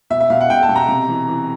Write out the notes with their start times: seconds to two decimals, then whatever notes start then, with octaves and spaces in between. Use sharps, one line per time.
0.10 B2 E5
0.20 E5
0.30 B2 F5
0.41 F#5
0.50 B2 G5
0.63 A5
0.69 B2
0.76 A#5
0.89 C3
1.08 E3
1.29 E3